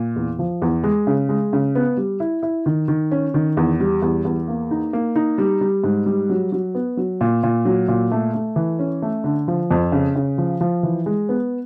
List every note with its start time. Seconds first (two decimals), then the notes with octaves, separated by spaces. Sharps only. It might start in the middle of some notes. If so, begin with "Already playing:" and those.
Already playing: A#2
0.16 E2
0.39 F3
0.62 E2
0.84 G#3
1.07 C#3
1.29 G#3
1.53 C#3
1.75 B3
1.97 G3
2.20 E4
2.43 E4
2.66 D#3
2.88 D#3
3.12 C#4
3.34 D#3
3.57 E2
3.80 G3
4.02 E2
4.25 E2
4.48 A#3
4.71 D#4
4.93 A#3
5.16 D#4
5.38 G3
5.61 G3
5.84 G#2
6.06 G3
6.29 F#3
6.52 F#3
6.75 B3
6.97 F#3
7.21 A#2
7.43 A#2
7.65 F#3
7.88 A#2
8.11 A3
8.34 A3
8.56 E3
8.79 C#4
9.02 A3
9.24 D3
9.48 F3
9.71 F2
9.92 C#3
10.15 C#3
10.38 F3
10.61 F3
10.83 E3
11.06 G#3
11.29 B3